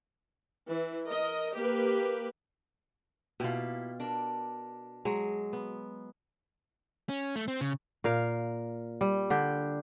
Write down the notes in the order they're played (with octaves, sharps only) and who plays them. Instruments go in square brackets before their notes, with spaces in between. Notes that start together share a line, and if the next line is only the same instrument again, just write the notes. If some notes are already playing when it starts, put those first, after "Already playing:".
[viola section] E3
A#4 D#5
A#3 G4 B4
[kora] B2 F4 [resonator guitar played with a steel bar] A#3 E4 G4
[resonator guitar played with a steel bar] D4 A#4
[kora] F#3 G#3
B3
[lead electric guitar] C#4
A3
C4
C#3
[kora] A#2 A#4 F5
G3
D3 G4